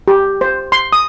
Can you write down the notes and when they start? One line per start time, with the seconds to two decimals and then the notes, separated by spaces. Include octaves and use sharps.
0.08 G4
0.41 C5
0.72 C6
0.93 D#6